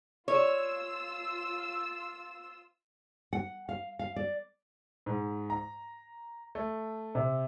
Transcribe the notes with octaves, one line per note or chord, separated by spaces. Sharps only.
F4 C#5 E6
F#5
F5
F5
D5
G#2
A#5
A3
C3